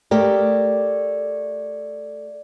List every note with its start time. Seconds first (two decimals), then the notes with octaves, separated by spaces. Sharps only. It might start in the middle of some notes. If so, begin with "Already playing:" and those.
0.11 A3 G4 A#4 D5